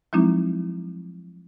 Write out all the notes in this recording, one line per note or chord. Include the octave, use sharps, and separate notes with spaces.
F3 F#3 G#3 C4 D#4 E4